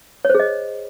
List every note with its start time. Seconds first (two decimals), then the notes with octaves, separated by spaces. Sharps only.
0.25 C#5
0.30 C5
0.35 G#4
0.40 D#5